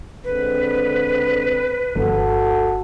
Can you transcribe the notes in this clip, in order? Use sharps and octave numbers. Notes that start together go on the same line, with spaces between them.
D3 G#3 C4 B4
G1 F#4 A4